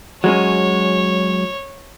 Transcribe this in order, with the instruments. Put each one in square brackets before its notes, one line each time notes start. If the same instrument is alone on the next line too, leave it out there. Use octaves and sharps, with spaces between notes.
[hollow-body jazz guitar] F#3 G#3 C#4 [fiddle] C#5